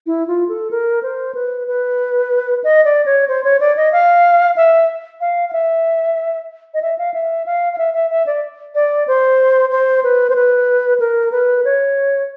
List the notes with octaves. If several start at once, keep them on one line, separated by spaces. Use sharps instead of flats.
E4
F4
A4
A#4
C5
B4
B4
D#5
D5
C#5
C5
C#5
D5
D#5
F5
E5
F5
F5
E5
D#5
E5
F5
E5
F5
F5
E5
E5
E5
D5
D5
C5
C5
B4
C5
B4
A#4
B4
C#5